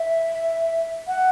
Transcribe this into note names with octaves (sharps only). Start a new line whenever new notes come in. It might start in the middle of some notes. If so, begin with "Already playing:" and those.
Already playing: E5
F#5